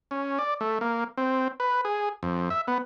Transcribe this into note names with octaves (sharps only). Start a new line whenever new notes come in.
C#4
D5
A3
A#3
C4
B4
G#4
F2
E5
B3